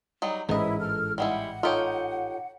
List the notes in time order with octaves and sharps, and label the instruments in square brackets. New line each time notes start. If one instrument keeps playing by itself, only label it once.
[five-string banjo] F#3 G3 D#4
[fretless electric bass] A1 G#2 E3 [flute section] E4 [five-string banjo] A#4 D#5
[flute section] A4 F6
[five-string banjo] G3 G#3 E4 [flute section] F#5
[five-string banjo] D#4 G4 [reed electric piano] F4 A4 C#5